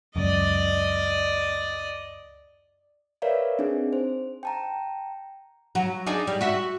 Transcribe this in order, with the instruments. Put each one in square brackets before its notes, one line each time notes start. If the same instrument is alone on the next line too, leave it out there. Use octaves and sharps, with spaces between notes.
[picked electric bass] C#2 F#2 [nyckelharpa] D5 D#5
[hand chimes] A#4 B4 C#5 D5 E5 F5
C4 D4 D#4 G#4
C5
G5 A5 A#5
[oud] F#3
D4 D#4 G#4
G3
F#4 E5